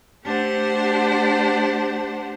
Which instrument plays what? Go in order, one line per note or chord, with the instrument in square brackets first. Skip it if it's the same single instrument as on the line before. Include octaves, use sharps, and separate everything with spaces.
[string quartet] A3 D4 G4 C5 F#5